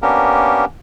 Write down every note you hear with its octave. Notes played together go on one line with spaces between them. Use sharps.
A#3 B3 C#4 D4 G4 A#4